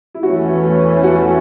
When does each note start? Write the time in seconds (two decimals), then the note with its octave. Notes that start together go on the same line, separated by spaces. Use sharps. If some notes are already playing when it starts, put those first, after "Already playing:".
0.14 E4
0.23 E2 E3 A3 C#4 F#4
1.03 F#4